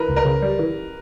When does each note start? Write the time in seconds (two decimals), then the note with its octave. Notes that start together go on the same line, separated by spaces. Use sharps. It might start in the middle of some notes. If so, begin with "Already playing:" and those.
Already playing: E3 A#4 B4
0.09 C#2
0.16 A#4
0.25 C#3
0.42 G3
0.59 E3